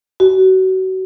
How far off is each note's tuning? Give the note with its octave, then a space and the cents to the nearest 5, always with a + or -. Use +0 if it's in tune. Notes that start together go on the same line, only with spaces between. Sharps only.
F#4 +30